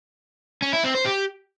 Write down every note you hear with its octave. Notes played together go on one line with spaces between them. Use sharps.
C#4
E4
C4
C5
G4